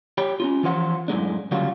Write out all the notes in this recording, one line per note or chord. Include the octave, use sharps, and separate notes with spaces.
G4 C#5 G5 B5
C#4 D#4 F4
E3 F3 C5 F#5
F#2 A2 G#3 D4
D2 C#3 F#3 G3 F4 F#4